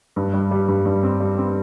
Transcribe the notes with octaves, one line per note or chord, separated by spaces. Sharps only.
G2
G3
G3
G2
G2
C4
G3
C4